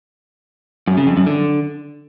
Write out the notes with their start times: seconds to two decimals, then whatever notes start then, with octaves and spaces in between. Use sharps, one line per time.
0.87 F#2
0.97 C#3
1.07 F2
1.17 F#2
1.26 D3